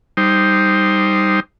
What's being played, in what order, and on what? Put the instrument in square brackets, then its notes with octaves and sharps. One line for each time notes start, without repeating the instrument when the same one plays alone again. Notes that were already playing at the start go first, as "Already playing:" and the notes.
[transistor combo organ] G3 D#4 C5